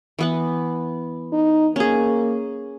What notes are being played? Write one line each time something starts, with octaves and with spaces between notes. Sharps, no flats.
E3 B3 F#5
D#4
A#3 C#4 G#4